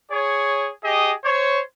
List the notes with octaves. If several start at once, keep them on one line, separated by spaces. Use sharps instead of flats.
G#4 C#5
G4 G#4 D#5
C5 C#5